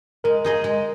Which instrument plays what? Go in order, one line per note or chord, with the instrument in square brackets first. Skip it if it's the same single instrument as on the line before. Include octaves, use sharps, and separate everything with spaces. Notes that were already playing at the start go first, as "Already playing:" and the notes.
[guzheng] G#3 [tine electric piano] A#4
[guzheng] D#4 G#4 D#5
G#3